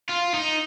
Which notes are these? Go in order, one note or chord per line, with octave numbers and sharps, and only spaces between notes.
F4
D#4